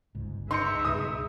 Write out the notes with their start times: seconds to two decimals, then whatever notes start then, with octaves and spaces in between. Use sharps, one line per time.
0.15 G1 C#2 G#2
0.51 D#4 G#4 B4 E5 C6 G6 C#7
0.85 C#2 G2 B2 D#6